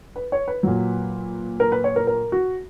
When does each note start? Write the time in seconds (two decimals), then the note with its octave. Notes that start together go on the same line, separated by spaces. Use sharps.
0.16 B4
0.32 C#5
0.48 B4
0.63 A#2 F#3
1.60 A#4
1.72 B4
1.84 C#5
1.96 A#4
2.07 A#4
2.32 F#4